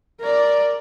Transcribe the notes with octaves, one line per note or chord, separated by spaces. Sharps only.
A#4 D5